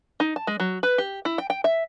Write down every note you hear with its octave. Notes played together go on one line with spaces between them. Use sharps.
D#4
A5
G#3
F#3
B4
G4
E4
G5
G5
E5